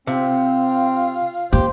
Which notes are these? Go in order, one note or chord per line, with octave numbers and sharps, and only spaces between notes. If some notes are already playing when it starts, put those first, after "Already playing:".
C3 C4 F4
A#3 G4 C5